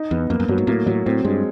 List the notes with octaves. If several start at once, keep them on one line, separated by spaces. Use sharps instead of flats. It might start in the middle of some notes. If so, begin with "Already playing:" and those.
Already playing: D#4
E2 B3
F2 A#3
F#2
G2 F#3
G#2
A2 A#3
A2 F#3
A2 C4
G2 G#3